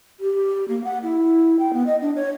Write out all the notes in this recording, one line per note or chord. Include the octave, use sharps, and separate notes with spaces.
G4
A#3
F#5
E4
G5
B3
D#5
D4
C#5